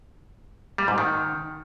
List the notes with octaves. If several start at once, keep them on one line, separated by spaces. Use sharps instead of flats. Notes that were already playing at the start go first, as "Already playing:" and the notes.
G3
G#2
D#3